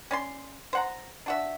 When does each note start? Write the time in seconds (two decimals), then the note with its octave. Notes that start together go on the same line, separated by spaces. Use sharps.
0.11 C#4 D5 C6
0.73 C5 F#5 A#5
1.26 D4 F#4 E5